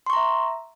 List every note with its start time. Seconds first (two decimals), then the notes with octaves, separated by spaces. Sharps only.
0.06 C6
0.10 C#6
0.13 A#5
0.16 E5